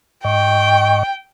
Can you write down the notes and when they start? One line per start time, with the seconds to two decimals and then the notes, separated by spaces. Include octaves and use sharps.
0.25 G#2 D#5 G5 C#6